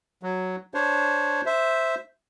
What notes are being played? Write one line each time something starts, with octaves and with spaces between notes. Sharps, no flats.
F#3
D4 C5 C#5
C5 E5